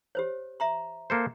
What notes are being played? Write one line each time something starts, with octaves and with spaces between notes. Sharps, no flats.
G4 C5 C#5
E5 A#5 C6
A#3 A4 C5